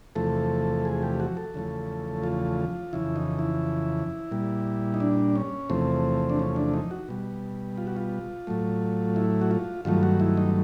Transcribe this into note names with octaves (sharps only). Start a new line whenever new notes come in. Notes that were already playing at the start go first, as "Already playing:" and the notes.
E2 C3 F3 A3 A4
G#4
G4
F#4
A4
E2 C#3 F3 A3
F4
F2 C#3 E3 E4
D#4
E4
A#2 G3
D#4
D4
C#4
E2 C3 F3 A3 C4
D4
C#4
D4
D#4
F#4
B2 G3
F4
F#4
F4
A2 F#3 A3
E4
F#4
F4
G2 D#3 F#3 A3 F4
F#4
E4
D#4